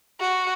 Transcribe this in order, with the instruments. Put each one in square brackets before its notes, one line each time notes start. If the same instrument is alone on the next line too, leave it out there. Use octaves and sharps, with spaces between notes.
[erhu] F#4